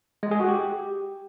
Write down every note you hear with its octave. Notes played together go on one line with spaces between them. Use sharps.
G#3
G#4
F#4
G4